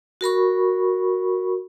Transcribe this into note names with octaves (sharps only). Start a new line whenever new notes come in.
F#4 A#4 B5 C#6